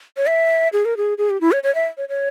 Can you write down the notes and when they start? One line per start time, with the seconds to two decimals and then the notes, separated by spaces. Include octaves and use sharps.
0.17 C#5
0.28 E5
0.73 G#4
0.85 A#4
0.97 G#4
1.18 G#4
1.30 G4
1.41 E4
1.52 C#5
1.63 C#5
1.75 E5
1.97 C#5
2.09 C#5